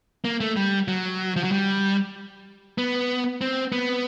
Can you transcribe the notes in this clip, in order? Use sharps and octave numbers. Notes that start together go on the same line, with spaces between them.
A#3
A3
G3
F#3
F3
F#3
G3
B3
C4
B3